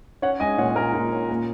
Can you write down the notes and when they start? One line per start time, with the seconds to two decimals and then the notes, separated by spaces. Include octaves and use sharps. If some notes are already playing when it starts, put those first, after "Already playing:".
0.22 C#4 C#5 F#5
0.40 G#3 D#5 G#5
0.58 A#2 C#5 F#5
0.76 A#2 A#4
0.94 A#2
1.12 C#4
1.29 A#3